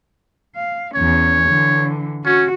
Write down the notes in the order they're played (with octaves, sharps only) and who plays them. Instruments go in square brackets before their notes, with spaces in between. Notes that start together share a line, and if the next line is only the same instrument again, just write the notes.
[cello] F5
[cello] E2 C#4 [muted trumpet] C#5
[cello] D3 E3
[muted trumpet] C#4 [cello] F#4